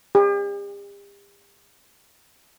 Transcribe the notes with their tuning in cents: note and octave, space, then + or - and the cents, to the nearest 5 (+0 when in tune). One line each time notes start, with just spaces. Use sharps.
G4 +45